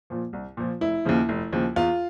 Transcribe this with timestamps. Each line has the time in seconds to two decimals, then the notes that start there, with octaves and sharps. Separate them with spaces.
0.10 A#2 F3
0.33 C2
0.57 A#2 F3
0.81 F1 E4
1.05 D#2 C#3 F3
1.29 F1
1.52 D#2 C#3 F3
1.76 E2 F4